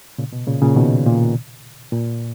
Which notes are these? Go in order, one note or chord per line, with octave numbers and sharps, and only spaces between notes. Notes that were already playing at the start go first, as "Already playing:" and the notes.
A#2 C#3
B2
A#2 C#3
A#2 C#3
B2 D#3
A#2
A#2